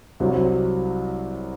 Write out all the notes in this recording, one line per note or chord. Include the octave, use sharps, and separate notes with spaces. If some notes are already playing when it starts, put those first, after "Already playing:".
C2 C3 F#3